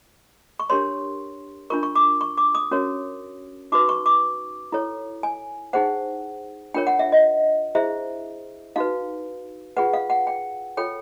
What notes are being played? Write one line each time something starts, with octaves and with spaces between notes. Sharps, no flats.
C#6
D4 G4 A#4 C#5 C6
D4 F4 A#4 C#6
C#6
D6
C#6
D6
D#6
C#4 F#4 A#4 C#5
D#4 F#4 B4 D6
C#6
D6
E4 A4 C#5
G#5
D#4 G#4 C5 F#5
D4 F4 A#4 C#5 G5
F#5
E5
D#5
E4 G#4 C5 E5
D#4 F#4 B4 F5
F4 G#4 B4 F#5
F5
F#5
G5
F4 A4 C#5 G5